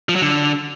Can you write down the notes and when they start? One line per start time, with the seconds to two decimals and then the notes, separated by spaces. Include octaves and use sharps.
0.09 F3
0.15 F#3
0.22 D3